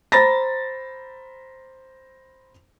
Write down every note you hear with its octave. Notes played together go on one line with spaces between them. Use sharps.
C5 A#5 B5 A6 A#6